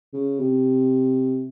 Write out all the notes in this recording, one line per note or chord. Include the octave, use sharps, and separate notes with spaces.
C#3
C3